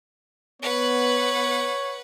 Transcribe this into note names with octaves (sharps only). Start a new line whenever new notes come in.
B3 B4 C#5 F#5